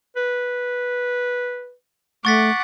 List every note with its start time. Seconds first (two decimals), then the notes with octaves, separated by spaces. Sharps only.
0.16 B4
2.25 A3 F#5 C#6 D6 A6 B6